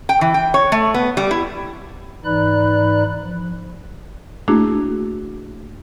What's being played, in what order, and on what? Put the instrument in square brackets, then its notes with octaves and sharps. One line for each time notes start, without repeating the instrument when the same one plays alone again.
[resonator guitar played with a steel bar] G5
E3
G5
C#5
A3
B3
G3
E4
[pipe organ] G#2 E3 D#4 D5 B5 F#6
F3
[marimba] A3 A#3 D4 E4 F#4 G#4